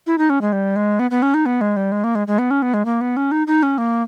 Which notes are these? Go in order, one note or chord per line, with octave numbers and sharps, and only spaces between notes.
E4
D#4
C#4
G#3
G3
G#3
B3
B3
C#4
D#4
B3
G#3
G3
G#3
A#3
G#3
G#3
B3
C#4
B3
G#3
A#3
B3
C#4
D#4
D#4
C#4
A#3